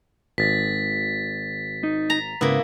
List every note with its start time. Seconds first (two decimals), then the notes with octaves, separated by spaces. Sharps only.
0.38 G#1 A6 B6
1.83 D#4
2.10 A#5
2.41 G#2 C#3 A#3 B3 E4 B4